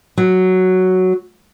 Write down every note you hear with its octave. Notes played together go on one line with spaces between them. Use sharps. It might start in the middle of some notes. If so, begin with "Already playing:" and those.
F#3